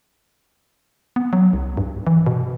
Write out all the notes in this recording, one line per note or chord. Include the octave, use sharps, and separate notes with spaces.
B3
F#3
C2
G2
E3
B2